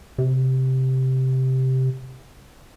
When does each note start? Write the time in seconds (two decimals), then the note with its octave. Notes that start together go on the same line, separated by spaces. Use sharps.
0.18 C3